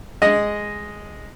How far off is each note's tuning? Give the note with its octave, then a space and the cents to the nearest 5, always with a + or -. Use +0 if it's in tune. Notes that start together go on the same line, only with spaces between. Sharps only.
G#3 +0 D#5 +0